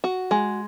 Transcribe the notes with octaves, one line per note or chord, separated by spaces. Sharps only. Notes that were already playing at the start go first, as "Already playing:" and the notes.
F#4
G#3